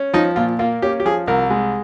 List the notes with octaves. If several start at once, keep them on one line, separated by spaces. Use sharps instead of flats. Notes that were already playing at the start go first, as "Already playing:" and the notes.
Already playing: C#4
F3 D#4
A#2 F4
A#3 F4
C#4 G4
G4
F3 G#4
C2 A#4
G#3